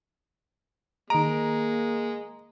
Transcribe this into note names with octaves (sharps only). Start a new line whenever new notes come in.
D#3 G#3 A#3 A#5 D7